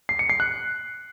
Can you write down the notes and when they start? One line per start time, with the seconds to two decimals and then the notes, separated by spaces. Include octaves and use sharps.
0.09 C7
0.19 C#7
0.30 C7
0.40 F#6